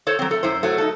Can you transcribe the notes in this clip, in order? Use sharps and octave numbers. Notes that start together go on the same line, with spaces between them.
A4 C5 C#5
F#3 C4
A3 A4
F#2 E4 C5
F#3 A3
D#4 A4